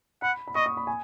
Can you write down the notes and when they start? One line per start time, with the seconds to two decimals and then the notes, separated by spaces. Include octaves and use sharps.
0.22 F#5 B5
0.48 B5
0.55 D#5 C#6
0.66 D#6
0.77 B5
0.87 G#5